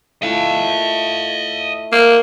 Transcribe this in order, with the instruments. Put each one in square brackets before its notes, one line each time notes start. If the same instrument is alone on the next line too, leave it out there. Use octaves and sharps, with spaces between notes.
[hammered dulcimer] A3 E4 F4 [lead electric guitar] D#5 F5
[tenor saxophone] A#3